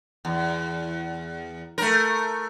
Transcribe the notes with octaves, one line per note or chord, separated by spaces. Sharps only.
E2
A3 A#4